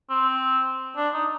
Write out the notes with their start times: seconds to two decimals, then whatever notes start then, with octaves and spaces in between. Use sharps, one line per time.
0.10 C4
0.97 D4
1.14 D#4